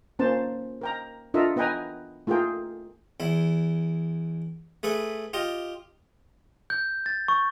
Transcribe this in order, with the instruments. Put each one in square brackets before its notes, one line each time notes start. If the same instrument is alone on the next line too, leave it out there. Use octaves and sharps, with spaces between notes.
[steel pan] A#3 C#4 C5 A5
A#4 G5 A#5
D4 F4 A4 A#4 D#5 E5
B3 B4 D#5 G5 G#5 A#5
A3 F4 G#4 A#4 G5
[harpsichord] E2 E4
A3 G#4 B4 E5
F4 G4 D#5
[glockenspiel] G6
A6
C#6